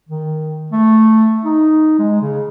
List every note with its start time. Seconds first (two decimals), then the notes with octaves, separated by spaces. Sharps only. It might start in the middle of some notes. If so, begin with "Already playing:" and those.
0.09 D#3
0.72 A3
1.44 D#4
1.99 G#3
2.22 C#3